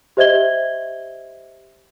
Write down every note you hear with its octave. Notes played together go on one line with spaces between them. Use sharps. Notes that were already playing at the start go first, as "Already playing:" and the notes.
G4 C5 D#5 E5 G#6 G7